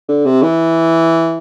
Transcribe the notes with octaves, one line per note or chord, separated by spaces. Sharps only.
D3
C3
E3